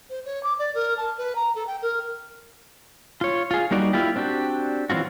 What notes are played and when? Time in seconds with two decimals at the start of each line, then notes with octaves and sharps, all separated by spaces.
0.09 C5
0.25 C#5
0.43 D6
0.58 D5
0.74 A#4
0.97 A5
1.17 B4
1.35 A#5
1.55 A4
1.67 G5
1.82 A#4
3.21 F4 C#5
3.51 F4 G#4
3.71 G3 A#3 D#4 F#4 D5
3.93 A#3 E4 F4 G4
4.16 C4 D4 F#4 G4
4.90 E3 F#3 C4 F4 F#4